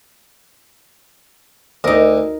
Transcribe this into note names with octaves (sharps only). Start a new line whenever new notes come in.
D2 D#4 A#4